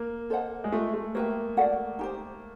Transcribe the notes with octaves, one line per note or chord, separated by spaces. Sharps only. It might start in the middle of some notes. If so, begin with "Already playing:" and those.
Already playing: A#3
A4 C5 D#5 F#5
G#3
A3 F4 A#4 D#5
A3
A#3 F#4 B4 E5 G5
F#4 A4 D5 F#5
D#4 G4 C5